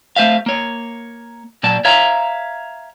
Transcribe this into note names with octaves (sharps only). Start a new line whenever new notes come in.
A3 C5 E5 F5
A#3 C#5
A#2 F#3 D5 A5
C#5 E5 F5 A#5